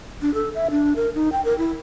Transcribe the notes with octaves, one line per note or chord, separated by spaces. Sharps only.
D4
A4
E5
D4
A#4
D#4
G5
A#4
E4